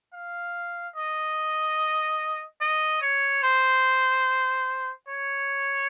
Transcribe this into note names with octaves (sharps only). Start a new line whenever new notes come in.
F5
D#5
D#5
C#5
C5
C#5